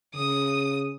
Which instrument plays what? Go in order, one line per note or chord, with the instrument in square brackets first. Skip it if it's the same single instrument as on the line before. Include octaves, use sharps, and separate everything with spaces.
[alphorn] C#3 [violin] D#6